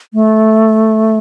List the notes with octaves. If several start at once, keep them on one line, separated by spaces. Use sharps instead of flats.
A3